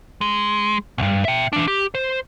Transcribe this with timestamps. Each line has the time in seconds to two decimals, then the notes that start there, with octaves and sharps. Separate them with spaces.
0.21 G#3
0.98 B1 G2
1.25 E5 G5
1.53 E3 D4
1.67 G4
1.95 C5